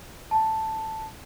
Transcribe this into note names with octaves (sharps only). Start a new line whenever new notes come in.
A5